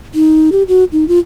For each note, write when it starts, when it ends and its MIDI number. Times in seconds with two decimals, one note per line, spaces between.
0.14 0.50 63
0.52 0.63 67
0.68 0.84 66
0.92 1.07 63
1.08 1.19 65